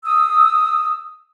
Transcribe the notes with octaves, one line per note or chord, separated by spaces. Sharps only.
D#6 E6